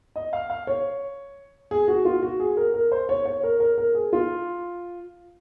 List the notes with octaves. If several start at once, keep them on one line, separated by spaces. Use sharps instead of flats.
D#5
F5
F5
C#5
G#4
F#4
F4
F#4
G#4
A#4
A#4
C5
C#5
C#5
A#4
A#4
A#4
G#4
F4